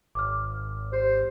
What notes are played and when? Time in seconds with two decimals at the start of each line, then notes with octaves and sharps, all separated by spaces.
0.15 G#1 D6 F6
0.93 G4 C5